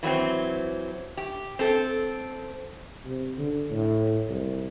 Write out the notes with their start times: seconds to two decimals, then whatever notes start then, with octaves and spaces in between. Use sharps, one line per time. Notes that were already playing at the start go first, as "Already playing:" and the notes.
0.03 E3 F#3 B3 C4
1.17 G4
1.59 C4 A4
3.05 C3
3.38 D3
3.71 A2
4.29 C2